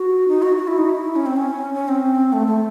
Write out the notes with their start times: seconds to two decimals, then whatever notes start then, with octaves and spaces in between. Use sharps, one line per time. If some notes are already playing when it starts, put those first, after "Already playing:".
Already playing: F#4
0.28 D#4
0.42 F#4
0.57 F#4
0.67 E4
0.78 D#4
0.89 E4
1.16 C#4
1.26 C4
1.36 C#4
1.74 C#4
1.89 C4
2.33 A3
2.47 A3